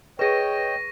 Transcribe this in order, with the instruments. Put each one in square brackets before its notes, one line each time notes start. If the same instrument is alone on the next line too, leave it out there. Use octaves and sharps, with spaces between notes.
[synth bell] G#4 B4 [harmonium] C#5 D#5 G5 [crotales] C#6 A#6 D#7